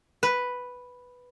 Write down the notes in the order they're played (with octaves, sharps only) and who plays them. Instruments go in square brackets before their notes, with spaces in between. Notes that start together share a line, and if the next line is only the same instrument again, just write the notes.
[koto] B4